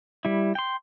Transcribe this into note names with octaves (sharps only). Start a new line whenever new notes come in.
G3 E4
G5 C6